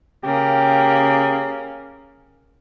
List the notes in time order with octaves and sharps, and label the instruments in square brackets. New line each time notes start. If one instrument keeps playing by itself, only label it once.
[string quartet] C#3 A#3 [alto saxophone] G4